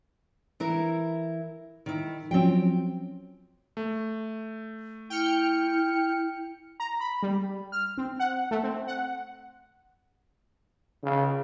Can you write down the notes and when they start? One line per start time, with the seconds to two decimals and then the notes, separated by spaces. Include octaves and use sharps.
0.60 E3 E4 A#4
1.86 D#3 E4
2.31 F3 F#3 C4 C#4 G5
3.77 A3
5.10 E4 G5 F6 C#7
6.80 A#5
7.00 B5
7.23 G3
7.72 F6
7.98 C4
8.19 F#5
8.51 A3
8.63 C4
8.87 F#5
11.04 C#3